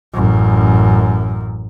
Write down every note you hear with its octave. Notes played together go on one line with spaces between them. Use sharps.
A1 F#2